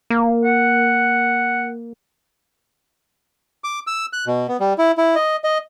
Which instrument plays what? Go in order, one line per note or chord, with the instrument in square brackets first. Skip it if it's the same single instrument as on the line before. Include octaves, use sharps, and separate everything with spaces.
[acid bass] A#3
[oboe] F#5
[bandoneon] D6
E6
F#6
B2
B3
G3
E4
E4
D#5
D#5